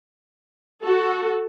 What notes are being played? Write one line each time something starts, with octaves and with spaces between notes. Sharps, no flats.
F#4 A4